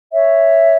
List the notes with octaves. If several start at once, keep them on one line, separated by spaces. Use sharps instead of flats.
C#5 E5